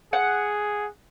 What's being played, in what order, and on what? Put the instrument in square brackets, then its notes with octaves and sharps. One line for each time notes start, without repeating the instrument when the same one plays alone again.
[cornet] G#4 [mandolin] F#5